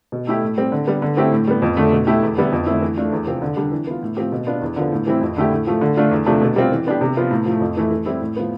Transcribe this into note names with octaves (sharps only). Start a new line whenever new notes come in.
B2
A3 E4 G4
A2
G3 C4
D3
G3 B3
D3
A3 C4 E4 G4
A2
G3 B3
F2
D3 A3
B2
A3 E4 G4
E2
D3 G3 B3 E4
F2
D3 A3 C4 E4
E3
A3 D4 F4
E2
C3 F3 C4
D3
G3 D4
E3
B3 F4
A2
F3 C4 G4
B2
B3 D4 F4
E2
D3 F3 B3
A2
E3 G3 C4 E4
F2
D3 A3 E4 G4
A2
F3 A3
D3
A3 D4 F4
E2
C3 F3 A3 D4
B2
G3 C4 F4
E3
B3 D4 G4
C3
F3 B3 F4
A2
F3 A3
F2
E3 A3 E4
E3
G3 C4 E4
A2
F3 B3